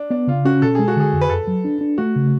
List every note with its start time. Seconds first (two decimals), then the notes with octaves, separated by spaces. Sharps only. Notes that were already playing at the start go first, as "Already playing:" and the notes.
Already playing: D4
0.10 B3 D4
0.27 C#3 F4
0.45 C#4 F#4
0.62 B2 A4
0.75 G#3 G#4
0.88 F#4
0.96 D3 G#4
1.13 F2
1.21 B4
1.30 F#2 A4
1.47 F#3
1.65 D4
1.81 D4
1.98 A3 F#4
2.16 C#3